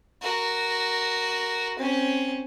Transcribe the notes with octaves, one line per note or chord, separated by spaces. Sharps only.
F#4 A#4
C4 C#4